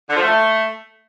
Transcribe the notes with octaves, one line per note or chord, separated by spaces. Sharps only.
D3
F3
A3